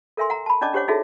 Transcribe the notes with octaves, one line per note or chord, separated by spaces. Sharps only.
A4 A#4 E5 G#5 C6
F#5 A#5
A5 B5
C#4 D4 D5 D#5 A5 D6
D4 G4 C5 C#5 F#5 D6
D#4 E4 F#4 G#4 A4 E5